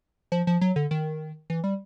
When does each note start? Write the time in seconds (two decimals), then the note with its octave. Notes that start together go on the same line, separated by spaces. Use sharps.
0.32 F3
0.47 F3
0.61 F#3
0.76 D3
0.91 D#3
1.50 E3
1.64 G3